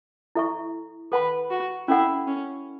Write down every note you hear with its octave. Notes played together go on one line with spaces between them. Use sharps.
E4 A4 E5 C#6
A4 B4 F#5 B5
F#4
C#4 E4 A4 F#5
C#4